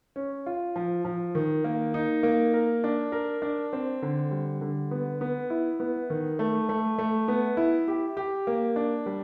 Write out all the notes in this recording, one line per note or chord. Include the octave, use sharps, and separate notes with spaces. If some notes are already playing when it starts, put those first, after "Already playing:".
C#4
F4
F3
F3
D#3
A#3
D#4
A#3
A#4
D4
A#4
D4
C4
D3
G3
D3
B3
B3
E4
B3
D#3
A3
A3
A3
B3
E4
G4
G4
A#3
D4
G3